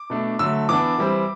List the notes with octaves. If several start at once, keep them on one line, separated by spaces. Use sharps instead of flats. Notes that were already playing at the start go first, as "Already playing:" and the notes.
Already playing: D6
B2 A3 D4
D3 F#3 A3 E6
E3 B3 D4 D6
E3 G3 C4